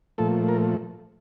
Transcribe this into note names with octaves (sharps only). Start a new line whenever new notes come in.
A#2 F3 A3 A4
A#4